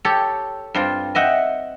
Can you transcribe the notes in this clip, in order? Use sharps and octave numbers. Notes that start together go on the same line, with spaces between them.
G4 A4 C#5
G2 C4 F4
D#5 E5 F#5 G5